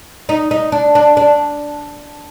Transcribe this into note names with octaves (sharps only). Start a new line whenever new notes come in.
D#4
D#4
D4
D4
D4